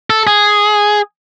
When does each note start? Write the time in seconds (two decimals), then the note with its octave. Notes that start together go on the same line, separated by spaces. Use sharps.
0.10 A4
0.27 G#4